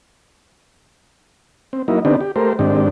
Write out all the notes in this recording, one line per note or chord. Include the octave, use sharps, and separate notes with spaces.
C4
F#3 A#3 D#4 E4
D3 B3 C4 D4 D#4 G4
G4
A3 G4 A#4 C5
G#2 D#3 C4 D4 G4